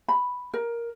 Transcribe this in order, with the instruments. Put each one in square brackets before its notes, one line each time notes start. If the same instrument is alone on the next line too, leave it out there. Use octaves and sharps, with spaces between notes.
[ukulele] B5
A#4